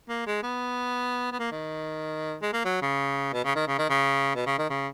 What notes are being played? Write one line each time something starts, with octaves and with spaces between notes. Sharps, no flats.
A#3
G#3
B3
B3
A#3
D#3
G#3
A#3
F#3
C#3
B2
C#3
D#3
C#3
D#3
C#3
B2
C#3
D#3
C#3